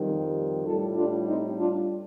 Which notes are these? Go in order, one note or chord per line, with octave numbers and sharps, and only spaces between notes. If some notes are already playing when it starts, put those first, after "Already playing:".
Already playing: F2 D#3 G3
A2 G3 F4 A4
D4 F4
C4 D#4
D4 F4